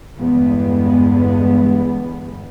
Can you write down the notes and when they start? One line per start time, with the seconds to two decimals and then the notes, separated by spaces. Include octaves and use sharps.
0.17 E2 G2 D3 G#3 B3